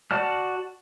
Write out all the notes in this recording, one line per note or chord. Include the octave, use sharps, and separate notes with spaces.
F#4 D5 A5 F6